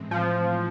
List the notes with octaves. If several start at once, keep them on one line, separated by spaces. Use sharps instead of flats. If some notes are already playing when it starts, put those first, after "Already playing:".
Already playing: A2 E3 G#3 C4
F3